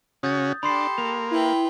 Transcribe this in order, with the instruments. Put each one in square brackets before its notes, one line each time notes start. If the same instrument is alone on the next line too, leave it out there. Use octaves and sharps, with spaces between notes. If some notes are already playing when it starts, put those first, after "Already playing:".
[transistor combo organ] C#3 C#4 F#4 [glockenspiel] D#6 G6 A6
[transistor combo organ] D4 [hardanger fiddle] G4 A4 [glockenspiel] B5 C6 C7
[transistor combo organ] A#3 [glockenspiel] F7
[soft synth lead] E4 [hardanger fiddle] B4 G5